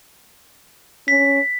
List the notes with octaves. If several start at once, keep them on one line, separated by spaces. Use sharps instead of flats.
C#4 B6